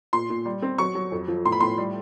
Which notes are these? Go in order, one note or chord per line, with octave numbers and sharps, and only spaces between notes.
A#2 C6
A#2
G3
C4
F#3 C#6
F#3
F2
F3
A2 C6
B5
A2 C6
G3